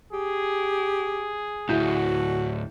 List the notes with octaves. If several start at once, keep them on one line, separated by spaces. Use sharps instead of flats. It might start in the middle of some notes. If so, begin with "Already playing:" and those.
G4 G#4
D2 A2 E4 F#4 G6